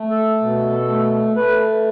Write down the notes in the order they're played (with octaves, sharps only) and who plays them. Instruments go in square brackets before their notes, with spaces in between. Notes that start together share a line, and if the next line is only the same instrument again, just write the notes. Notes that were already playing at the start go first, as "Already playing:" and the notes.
Already playing: [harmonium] A3
A4
B2
A3
A3 B4